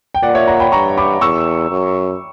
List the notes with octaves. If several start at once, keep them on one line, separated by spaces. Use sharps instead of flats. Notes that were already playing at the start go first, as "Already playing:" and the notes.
G5
A#2 D5 F#5
C#5 E5
F#5 A#5
G5 B5
G2 A#5 C#6
B5 D6
E2 C#6 E6
F#2